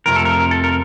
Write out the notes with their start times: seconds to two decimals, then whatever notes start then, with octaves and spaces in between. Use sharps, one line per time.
0.06 F2 C3 F3 A3 A#4
0.16 A4
0.25 A#4
0.51 A4
0.64 A#4